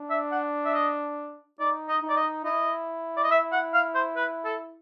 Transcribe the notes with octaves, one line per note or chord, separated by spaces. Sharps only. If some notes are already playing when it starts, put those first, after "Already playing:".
Already playing: D4
E5
F#5
E5
D#5
D#4 D5
D#5
D#4
D5
D#5
E4 D#5
D5
D#5
E5
F#5
F5
C5
B4
A4